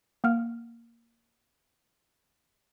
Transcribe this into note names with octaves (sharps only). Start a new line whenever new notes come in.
A#3 F#5 F6